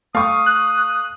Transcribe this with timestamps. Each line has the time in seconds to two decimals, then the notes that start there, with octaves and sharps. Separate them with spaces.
0.15 A3 F5 C#6 D#6
0.46 F#6